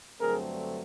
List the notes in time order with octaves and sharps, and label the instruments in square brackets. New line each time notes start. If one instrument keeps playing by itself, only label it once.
[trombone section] G2 D3 F#3 A3 C4 G#4 A#4